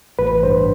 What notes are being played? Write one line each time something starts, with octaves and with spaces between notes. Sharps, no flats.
A1 B4
G2 C5